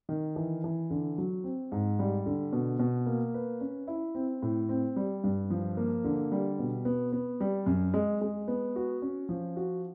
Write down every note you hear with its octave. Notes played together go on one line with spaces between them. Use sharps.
D#3
E3
E3
D3
F#3
C4
G#2
G3
D3
B2
B2
A#3
B4
C#4
E4
C4
A2
C4
G3
G2
F3
A#3
D3
G3
B2
B3
B3
G3
F#2
G#3
G#3
B3
F#4
C#4
F3
F#4